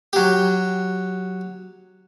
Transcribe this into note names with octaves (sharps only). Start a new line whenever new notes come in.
F#3 G4